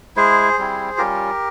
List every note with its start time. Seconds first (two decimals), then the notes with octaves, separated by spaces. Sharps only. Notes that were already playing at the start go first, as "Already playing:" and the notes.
0.17 G#3 E4 G#4 C5
0.58 G3 C4 E4
0.98 G3 C#4 F4 G4 A#4